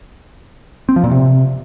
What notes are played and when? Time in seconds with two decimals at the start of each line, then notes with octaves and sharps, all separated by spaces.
0.89 C4
0.96 F3
1.04 A#2
1.11 C3